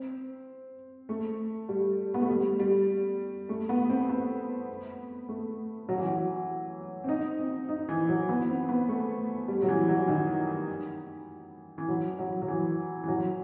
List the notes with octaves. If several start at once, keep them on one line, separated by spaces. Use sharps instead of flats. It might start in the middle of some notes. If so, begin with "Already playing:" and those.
Already playing: C4
A3
G3
B3
A3
G3
G3
A3
B3
C4
B3
A3
F#3
E3
F#3
C4
D#4
C4
D#4
E3
F#3
B3
C4
B3
A3
G3
F#3
E3
F#3
D#3
E3
F#3
F#3
F#3
E3
E3
F#3